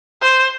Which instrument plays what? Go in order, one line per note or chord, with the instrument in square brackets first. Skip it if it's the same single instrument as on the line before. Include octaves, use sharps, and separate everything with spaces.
[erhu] C5